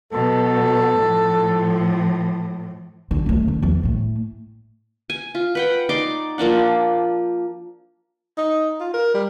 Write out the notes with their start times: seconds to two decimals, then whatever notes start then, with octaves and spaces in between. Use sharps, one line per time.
0.13 B2 F#3 A4
0.99 A2 F3
3.11 D3
3.26 F#2 A3
3.48 D3 A3
3.63 E2 F3
3.83 A2 A3
5.10 G#5
5.35 F4
5.55 B4 F#5 G5
5.89 D#4 D5 C6 D6
6.38 F3 A#3 D4 F#5
8.37 D#4
8.80 F4
8.93 A#4
9.14 G3